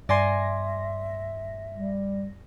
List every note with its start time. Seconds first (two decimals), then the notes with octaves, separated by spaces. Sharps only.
0.09 G2 D5 E5 G#5 C6 A#6
1.73 G3